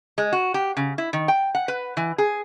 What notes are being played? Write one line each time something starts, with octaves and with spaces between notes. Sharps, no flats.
G#3
F#4
G4
C#3
E4
D#3
G5
F#5
B4
E3
G#4